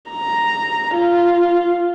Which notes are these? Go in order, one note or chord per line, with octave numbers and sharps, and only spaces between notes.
A#5
F4